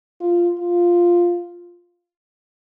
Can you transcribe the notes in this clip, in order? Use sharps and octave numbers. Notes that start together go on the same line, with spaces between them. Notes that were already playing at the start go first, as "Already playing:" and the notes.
F4
F4